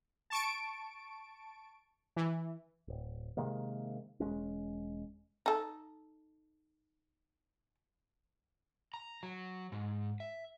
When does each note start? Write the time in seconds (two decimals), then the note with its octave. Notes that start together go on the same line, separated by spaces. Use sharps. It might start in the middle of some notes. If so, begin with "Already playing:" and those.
0.30 A5 C#6 D7
2.16 E3
2.88 D1
3.37 C3 D#3 G#3 A#3
4.20 E1 D#2 G#3 C#4
5.46 D#4 A4
8.94 A#5
9.23 F#3
9.72 G#2
10.20 E5